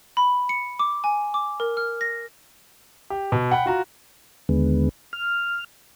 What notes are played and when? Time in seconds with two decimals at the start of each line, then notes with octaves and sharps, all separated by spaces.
0.17 B5
0.49 C#7
0.79 D6
1.04 G#5
1.34 D6
1.60 A#4
1.77 F6
2.01 A#6
3.10 G4
3.32 B2
3.51 F#5 G5 B5
3.66 F4 F#4 A#5
4.49 D#2 D3 G#3 B3
5.13 F6